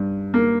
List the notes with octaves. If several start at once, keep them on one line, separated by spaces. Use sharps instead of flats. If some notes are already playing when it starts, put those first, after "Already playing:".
Already playing: G2
A#3